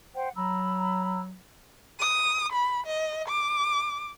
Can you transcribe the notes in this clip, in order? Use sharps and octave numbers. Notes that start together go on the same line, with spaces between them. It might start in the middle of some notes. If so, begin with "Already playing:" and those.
C5 F#5 G5
F#3 A#5 B5 E6
D#6
B5
D#5
D6